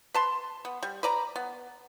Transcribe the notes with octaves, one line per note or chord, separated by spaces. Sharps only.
B4 A5 C6
B3
G3
B4 D5 A#5
B3